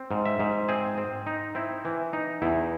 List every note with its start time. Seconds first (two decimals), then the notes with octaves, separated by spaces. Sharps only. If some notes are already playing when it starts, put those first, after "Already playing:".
Already playing: C4
0.11 G#2
0.25 E5
0.39 G#2
0.69 C4 G#4
0.98 C4
1.27 D#4
1.55 C4 E4
1.85 E3
2.13 D#4
2.42 E2 E4